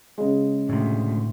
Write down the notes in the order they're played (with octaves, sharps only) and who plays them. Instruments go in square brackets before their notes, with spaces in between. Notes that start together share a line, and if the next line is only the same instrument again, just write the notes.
[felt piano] C#3 G#3
[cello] D2 [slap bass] A2 C3